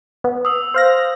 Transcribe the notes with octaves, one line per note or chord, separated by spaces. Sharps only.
B3
D#6 E6
C5 F5 A#6